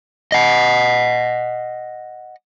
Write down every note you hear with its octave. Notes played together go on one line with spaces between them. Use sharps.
D#5 F#5